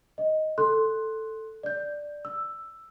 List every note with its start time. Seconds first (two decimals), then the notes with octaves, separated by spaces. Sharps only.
0.18 D#5
0.58 A4 C6 F#6
1.63 D5 G6
2.25 E6